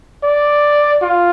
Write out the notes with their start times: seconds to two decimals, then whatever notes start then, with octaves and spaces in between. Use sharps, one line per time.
0.23 D5
1.02 F4